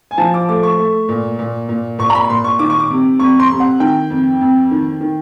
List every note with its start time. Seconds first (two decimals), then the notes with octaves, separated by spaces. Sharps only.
0.11 G#5
0.18 F3 A5
0.34 D6
0.49 A3 D6
0.63 C#6
0.78 A3
1.09 A#2
1.39 A#2
1.69 A#2
1.99 A#2 C#6
2.10 A#5
2.15 B5
2.30 A#2 C6
2.44 C#6
2.59 D#3 D6
2.70 C#6
2.80 D6
2.90 C3
3.19 F2 C#6
3.40 C6
3.50 C3
3.60 F#5
3.80 D#3 G5
4.10 F2
4.41 F2
4.71 D#3
5.01 D#3